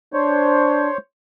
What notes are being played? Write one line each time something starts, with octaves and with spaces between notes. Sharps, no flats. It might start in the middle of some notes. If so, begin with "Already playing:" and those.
D4 C5 C#5